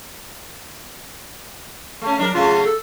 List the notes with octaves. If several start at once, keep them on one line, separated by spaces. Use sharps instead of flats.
A3 C#4
F#3 D4 A#4
C#3 F#3 A3 F4
A4